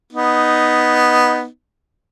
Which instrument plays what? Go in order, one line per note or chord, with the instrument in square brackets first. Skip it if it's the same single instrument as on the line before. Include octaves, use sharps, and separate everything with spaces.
[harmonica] B3 D#4